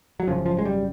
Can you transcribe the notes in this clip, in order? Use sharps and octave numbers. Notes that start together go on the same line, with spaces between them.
F#3
G#1 F#2 C#3 F3
F3
G#3
G3